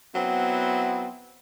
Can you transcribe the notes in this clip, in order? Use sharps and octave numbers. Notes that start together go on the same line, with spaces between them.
F#3 B3 C4 E4